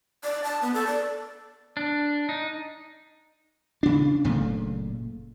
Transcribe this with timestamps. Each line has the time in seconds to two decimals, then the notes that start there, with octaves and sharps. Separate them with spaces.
0.24 D5
0.44 A5
0.62 B3
0.74 A4
0.87 D5
1.77 D4
2.29 D#4
3.83 C#3 D4
4.24 F#1 A#2 C#3 A3